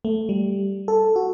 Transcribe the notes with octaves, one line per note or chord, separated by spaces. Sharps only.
A3
G3
A4
F#4